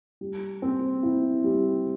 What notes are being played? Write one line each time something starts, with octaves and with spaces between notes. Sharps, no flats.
G3
C4
E4
G3